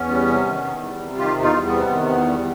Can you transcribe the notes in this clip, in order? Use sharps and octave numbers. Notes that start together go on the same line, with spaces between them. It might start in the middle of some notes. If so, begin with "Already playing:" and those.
Already playing: E2 B3 C#4
G3
C3
D#3
E2
G3
C3
D#3 F4 G4
E2
D#4 F4
G3
B3
C3
D#3
E2
G3